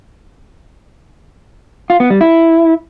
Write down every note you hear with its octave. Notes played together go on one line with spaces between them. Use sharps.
F4
B3
G3
E4